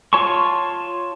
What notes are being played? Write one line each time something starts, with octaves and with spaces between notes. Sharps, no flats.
F4 C#5 A5 C6 C#6